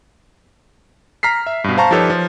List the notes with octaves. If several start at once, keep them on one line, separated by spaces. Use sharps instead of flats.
A#5 F6 B6 C7
E5
G2 B2
C5 F5 A5 A#5 C#6
F3 D#4 G4 A4 B4 C#5
F3